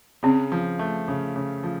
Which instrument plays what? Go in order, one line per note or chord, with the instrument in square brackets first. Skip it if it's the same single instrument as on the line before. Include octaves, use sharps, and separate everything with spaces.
[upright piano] C#3 [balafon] C4
[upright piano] F3
A3
C#3
C#3
F3